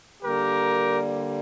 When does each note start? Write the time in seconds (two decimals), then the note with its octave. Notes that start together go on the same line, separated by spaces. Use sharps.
0.22 D3 G3 A#3 G4 A#4